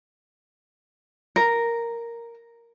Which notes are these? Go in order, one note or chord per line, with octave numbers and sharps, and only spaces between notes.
A#4